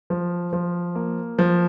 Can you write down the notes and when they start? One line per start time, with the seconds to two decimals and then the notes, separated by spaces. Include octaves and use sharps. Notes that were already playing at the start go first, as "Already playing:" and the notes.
0.10 F3
0.53 F3
0.95 A#3
1.39 F3